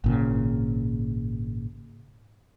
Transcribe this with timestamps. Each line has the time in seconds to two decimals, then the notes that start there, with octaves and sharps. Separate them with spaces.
0.04 G#1 A#2 C#3